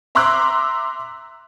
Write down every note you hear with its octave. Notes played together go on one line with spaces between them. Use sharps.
E5 A#5 C6 D6 E6 F#6